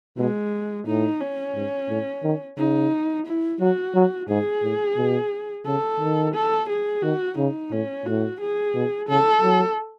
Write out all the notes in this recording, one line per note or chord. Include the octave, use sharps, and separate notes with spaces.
B2 G#3
A2 D#4
C#4
G#2
A2
D#3
C#3 D#4
E4
F#3 F#4
F#3
G#2 G#4
A2
B2
C#3 A4
D#3
A4
G#4
D#3 F#4
C#3 D#4
A2 C#4
A2 F#4
G#4
B2
C#3 A4
F#3